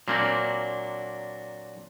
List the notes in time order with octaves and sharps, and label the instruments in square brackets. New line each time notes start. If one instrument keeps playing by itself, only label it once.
[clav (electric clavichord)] A#2 A#3 C4 [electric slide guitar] F#3 D4